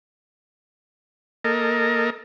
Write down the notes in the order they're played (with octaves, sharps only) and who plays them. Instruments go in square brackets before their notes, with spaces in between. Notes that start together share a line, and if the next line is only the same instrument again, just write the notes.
[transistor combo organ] A#3 A4 A#4 D#5